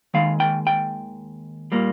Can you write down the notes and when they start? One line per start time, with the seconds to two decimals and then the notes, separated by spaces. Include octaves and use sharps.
0.14 D#2 D#3 G#3 F5
0.40 G5
0.67 G5
1.72 A#2 G3 A#3